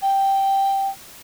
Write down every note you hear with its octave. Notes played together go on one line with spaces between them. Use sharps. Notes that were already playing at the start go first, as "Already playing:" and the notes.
G5